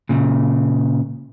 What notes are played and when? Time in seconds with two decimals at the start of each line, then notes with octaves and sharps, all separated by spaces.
0.09 A#2 C#3